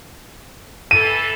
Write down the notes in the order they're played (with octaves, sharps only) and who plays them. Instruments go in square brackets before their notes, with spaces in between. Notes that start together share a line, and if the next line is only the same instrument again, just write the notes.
[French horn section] E3 A4 [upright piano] D#7